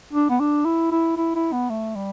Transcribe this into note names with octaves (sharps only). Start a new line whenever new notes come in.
D4
B3
D4
E4
E4
E4
E4
B3
A3
G3